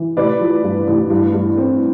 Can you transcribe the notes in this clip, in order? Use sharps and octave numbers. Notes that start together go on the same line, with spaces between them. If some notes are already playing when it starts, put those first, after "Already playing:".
Already playing: E3
A1 B4 D5
F3
G2
A1
G2
G2
C4